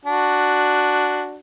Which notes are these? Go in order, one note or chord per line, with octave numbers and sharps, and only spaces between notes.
D4 F#4